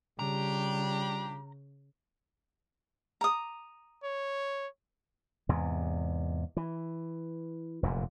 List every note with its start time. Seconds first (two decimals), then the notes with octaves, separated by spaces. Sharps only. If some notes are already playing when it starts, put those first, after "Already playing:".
0.19 C#3 G3 D4 F4 G4 A#5
3.21 A#5 D#6
4.04 C#5
5.49 E2 G#2 C3
6.57 E3
7.83 F1 F#2 A#2